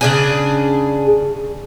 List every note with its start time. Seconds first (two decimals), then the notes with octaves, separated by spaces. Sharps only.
0.01 C#3 D4 G#4